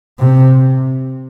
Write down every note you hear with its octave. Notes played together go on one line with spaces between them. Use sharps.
C3